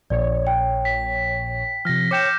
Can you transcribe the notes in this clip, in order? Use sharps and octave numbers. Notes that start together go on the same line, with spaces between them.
A#1 A#2 C#5 D5
G5
B6
C3 F3 F6 A#6
C#5 G5 D6 G6 A#6 C#7 E7